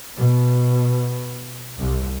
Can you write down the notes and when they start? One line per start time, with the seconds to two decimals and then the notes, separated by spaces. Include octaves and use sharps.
0.15 B2
1.78 C2